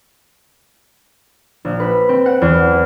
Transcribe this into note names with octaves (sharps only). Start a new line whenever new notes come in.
A#1
B4
C4
F#5
E2